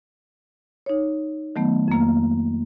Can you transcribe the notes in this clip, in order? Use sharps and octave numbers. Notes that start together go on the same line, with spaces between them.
D#4 C#5
D#3 F#3 A3 B3
F2 A#3